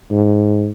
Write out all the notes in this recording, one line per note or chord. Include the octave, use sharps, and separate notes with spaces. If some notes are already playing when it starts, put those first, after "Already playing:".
G#2